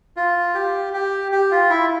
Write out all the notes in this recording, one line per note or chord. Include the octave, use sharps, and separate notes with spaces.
F4
G4
G4
G4
F4
E4